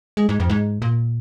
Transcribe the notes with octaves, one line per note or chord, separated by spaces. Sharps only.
G#3
G#2
F2
G#2
A#2